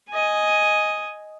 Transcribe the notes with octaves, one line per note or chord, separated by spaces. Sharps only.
D#5 G#5